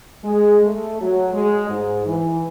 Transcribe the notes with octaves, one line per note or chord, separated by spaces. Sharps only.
G#3
A3
F#3
G#3
G#2
E3